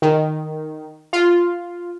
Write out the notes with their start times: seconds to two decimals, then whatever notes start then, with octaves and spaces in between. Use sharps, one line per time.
0.02 D#3
1.13 F4